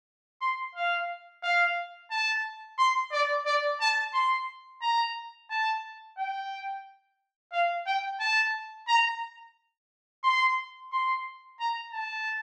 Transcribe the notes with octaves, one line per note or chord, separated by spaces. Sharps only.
C6
F5
F5
A5
C6
D5
D5
A5
C6
A#5
A5
G5
F5
G5
A5
A#5
C6
C6
A#5
A5